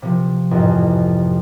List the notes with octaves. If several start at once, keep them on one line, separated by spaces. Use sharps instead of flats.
C3 F3
A1 F2 G#2